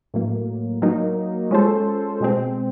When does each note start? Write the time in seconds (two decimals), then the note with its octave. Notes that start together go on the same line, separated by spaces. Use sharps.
0.14 A2 F#3 A#3
0.82 F#3 A#3 D#4
1.51 G#3 C#4 F4 A4 C5
2.20 B2 G#3 C4